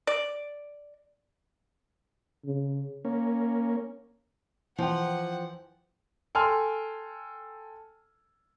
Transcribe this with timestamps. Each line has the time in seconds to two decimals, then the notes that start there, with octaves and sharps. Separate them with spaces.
0.07 D5
2.45 C#3
3.05 A#3 C#4
4.78 E3 F3 F#5 G5
6.35 A4 G5 G#5 C6 F6